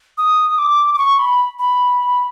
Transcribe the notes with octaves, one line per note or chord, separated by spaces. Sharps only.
D#6
D6
D6
C#6
B5
B5